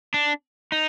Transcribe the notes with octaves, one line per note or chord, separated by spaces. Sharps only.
D4
D#4